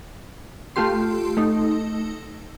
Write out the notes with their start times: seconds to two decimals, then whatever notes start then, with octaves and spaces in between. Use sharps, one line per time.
0.76 A3 F4 G4 C6
1.37 A3 D#4